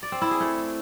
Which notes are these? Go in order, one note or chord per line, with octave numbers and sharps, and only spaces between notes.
D5
C4
E4
G#4
A3